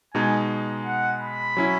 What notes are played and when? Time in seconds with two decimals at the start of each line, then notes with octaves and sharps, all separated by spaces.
0.14 B2 G#3 D#4 G#5
0.85 F#5
1.21 B5
1.57 F#3 C#4 E4